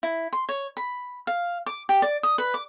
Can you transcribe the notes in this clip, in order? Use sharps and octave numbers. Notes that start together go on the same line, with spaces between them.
E4
C6
C#5
B5
F5
D6
G4
D5
D#6
B4
D6